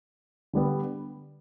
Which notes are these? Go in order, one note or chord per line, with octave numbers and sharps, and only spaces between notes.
D3 G3 B3